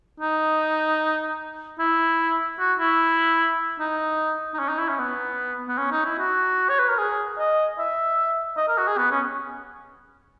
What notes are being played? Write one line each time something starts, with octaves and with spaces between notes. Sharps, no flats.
D#4
E4
F#4
E4
D#4
D#4
C#4
D#4
E4
C#4
B3
B3
C#4
D#4
E4
F#4
C#5
B4
A#4
G#4
D#5
E5
D#5
A#4
F#4
G#4
B3
C#4